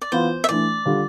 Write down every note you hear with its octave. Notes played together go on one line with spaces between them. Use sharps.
D5
E3 B3 F4 C5
E5
E3 A3 D4 D5
D3 G3 D4 F4